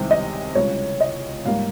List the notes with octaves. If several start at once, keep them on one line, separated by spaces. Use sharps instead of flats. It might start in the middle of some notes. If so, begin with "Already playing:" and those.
Already playing: C2 C3 D#3 G#3 C4
D#5
C#2 C#3 G3 C#5
D#5
G#2 G3 A#3 F5